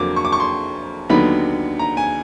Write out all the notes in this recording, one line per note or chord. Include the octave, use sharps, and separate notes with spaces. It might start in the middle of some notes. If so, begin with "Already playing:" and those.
Already playing: F2 D3 F#3 A#3 D6
C#6
D6
C#6
C6
D#2 D3 F#3 B3 D#4 B5
A#5
G#5